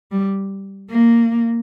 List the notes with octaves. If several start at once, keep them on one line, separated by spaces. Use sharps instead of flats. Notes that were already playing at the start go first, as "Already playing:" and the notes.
G3
A#3